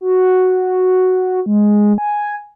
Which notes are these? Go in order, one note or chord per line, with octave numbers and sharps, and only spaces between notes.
F#4
G#3
G#5